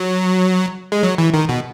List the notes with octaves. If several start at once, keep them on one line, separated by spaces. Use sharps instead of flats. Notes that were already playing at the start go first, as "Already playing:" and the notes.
Already playing: F#3
G#3
F#3
E3
D#3
B2